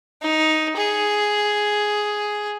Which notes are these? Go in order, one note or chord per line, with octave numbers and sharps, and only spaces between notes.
D#4
G#4